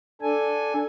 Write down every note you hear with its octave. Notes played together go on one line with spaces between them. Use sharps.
D4 A4 G#5